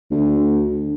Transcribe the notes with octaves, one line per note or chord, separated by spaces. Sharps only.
D2